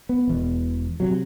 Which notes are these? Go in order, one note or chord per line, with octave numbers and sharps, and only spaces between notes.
B3
E1 E2 B2
C3 F#3